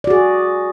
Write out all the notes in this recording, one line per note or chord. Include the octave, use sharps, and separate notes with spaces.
F#4 G#4 D5